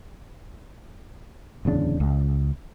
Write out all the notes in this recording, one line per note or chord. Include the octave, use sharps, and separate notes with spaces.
D1 E2 C#3 D4
C#2